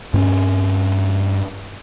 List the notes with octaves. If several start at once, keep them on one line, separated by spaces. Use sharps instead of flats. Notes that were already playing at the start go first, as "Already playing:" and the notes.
G2 C4 C#4